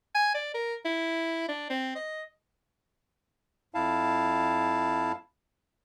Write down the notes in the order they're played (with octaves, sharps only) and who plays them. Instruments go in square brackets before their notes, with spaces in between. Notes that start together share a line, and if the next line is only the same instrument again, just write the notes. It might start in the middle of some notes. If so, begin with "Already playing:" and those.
[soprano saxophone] G#5
D5
A#4
E4
D4
C4
D#5
[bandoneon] F2 E4 F5 A5